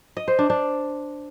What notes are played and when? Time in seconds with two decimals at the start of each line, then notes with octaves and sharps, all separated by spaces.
0.17 D#5
0.28 C5
0.39 D4
0.50 D4